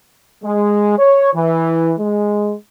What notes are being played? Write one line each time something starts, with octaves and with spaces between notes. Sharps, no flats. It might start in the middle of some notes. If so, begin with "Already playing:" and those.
G#3
C#5
E3
G#3